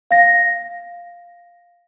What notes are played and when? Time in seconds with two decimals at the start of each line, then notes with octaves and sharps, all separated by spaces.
0.11 F5 A#6